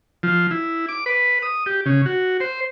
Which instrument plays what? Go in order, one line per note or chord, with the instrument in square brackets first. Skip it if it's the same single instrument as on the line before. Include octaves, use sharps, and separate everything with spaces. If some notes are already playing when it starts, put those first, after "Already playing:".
[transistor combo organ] F3
E4
D6
B4
D#6
G4
C#3
F#4
C5